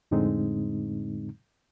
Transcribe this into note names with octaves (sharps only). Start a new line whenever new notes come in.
F2 A2 D3 G#3 C4 D#4